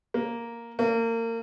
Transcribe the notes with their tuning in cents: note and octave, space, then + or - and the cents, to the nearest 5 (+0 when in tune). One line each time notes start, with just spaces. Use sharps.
A#3 +0
A#3 -30